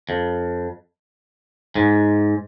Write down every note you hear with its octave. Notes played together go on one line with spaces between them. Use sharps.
F2
G#2